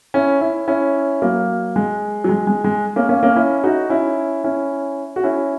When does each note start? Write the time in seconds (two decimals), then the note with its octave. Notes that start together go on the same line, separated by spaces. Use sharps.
0.14 C#4 E4
0.41 C#4 E4
0.68 C#4 E4
1.22 F#3 A#3
1.76 G#3
2.24 F#3
2.29 G#3
2.47 G#3
2.64 G#3
2.96 A#3 C#4
3.09 A#3 C#4
3.23 A#3 C#4
3.36 C#4 E4
3.64 D#4 F#4
3.90 C#4 E4
4.44 C#4 E4
5.16 F#4
5.24 C#4 E4